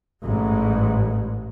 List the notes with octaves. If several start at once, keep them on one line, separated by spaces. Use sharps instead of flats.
A1 G#2